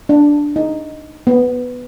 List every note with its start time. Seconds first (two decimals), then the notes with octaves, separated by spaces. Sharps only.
0.09 D4
0.56 D#4
1.27 B3